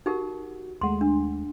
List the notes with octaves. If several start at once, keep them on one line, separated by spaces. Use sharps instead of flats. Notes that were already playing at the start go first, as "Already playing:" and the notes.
D#4 F#4 G4 A#4
D#2 G#3 A3 F#5 C6
D4